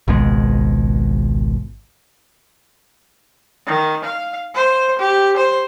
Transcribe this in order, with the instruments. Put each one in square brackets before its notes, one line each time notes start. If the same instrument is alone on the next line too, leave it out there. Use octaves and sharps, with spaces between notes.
[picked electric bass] G#1 C#2 B2 G#3
[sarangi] D#3
F5
C5
G4
C5